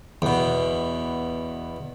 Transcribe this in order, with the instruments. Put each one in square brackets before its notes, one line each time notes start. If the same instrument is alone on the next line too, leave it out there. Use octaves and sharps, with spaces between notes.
[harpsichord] E2 B2